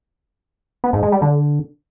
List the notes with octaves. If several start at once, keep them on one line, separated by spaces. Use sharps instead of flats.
B3
G#2
G#3
G3
D3